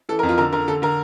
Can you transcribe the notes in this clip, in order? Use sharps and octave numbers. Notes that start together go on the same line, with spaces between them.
E3 A4
A#4
F2
F4
D3 A#4
D3 A#4
D3 A4
D3 A#4